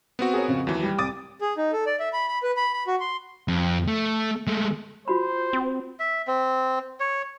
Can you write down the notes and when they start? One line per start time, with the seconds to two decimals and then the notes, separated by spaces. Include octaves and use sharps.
0.19 B3 C4 F#4
0.33 G#4 A#4 C#5
0.48 F2 C#3
0.67 D#2 E3 F#3
0.83 G3
0.99 C2 D6 D#6 A6
1.41 G#4
1.57 D#4
1.73 A4
1.87 D5
2.00 E5
2.13 B5
2.28 B5
2.43 B4
2.57 B5
2.73 B5
2.87 F#4
3.00 C6
3.48 F2
3.88 A3
4.47 G#3 A3
5.08 F4 F#4 C5 B5
5.53 C4
5.99 E5
6.27 C4
7.00 C#5